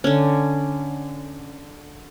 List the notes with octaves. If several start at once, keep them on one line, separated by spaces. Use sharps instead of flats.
D3 C#4